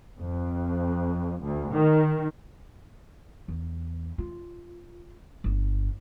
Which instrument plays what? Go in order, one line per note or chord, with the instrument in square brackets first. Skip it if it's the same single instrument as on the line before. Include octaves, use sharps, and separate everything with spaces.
[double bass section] F2
D2
D#3
[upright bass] E2
F4
G1